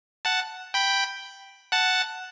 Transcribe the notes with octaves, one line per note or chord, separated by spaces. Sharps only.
F#5 A5
G5 B5
F#5 A5